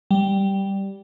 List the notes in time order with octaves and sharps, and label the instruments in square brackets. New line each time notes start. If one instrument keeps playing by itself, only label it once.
[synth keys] G3